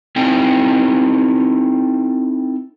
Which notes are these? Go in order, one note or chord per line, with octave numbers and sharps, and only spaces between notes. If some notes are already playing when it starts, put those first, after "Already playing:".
C4 D#4 E4 A4 G5 G#5